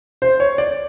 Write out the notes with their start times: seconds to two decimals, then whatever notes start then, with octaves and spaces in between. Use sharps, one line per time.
0.22 C5
0.40 C#5
0.58 D5